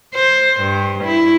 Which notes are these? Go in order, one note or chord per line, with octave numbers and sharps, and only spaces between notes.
C5
G2
E4